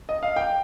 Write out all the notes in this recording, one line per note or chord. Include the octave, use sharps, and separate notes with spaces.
D#5
F5
G5